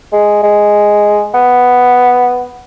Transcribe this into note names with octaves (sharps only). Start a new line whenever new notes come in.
G#3
G#3
B3